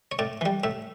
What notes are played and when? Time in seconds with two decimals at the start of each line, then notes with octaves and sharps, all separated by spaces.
0.12 C#5
0.19 A2 D5
0.41 E3 G3
0.64 A2 E5